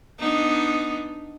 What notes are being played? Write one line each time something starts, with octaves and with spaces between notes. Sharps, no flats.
B3 D4 D#4